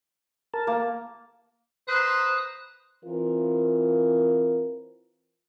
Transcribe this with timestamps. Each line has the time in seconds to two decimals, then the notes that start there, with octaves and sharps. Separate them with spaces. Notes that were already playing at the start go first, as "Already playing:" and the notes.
0.54 A#4 A5
0.67 A#3
1.88 B4 C5 A#5 D#6 F#6
3.05 E3 C4 F4 A#4